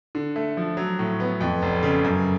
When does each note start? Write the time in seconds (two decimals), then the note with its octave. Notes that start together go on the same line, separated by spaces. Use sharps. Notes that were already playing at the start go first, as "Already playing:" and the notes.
0.15 D3
0.36 A3
0.57 F3
0.77 F#3
0.99 A2
1.20 B3
1.41 F2
1.62 F1
1.83 C#3
2.04 F#2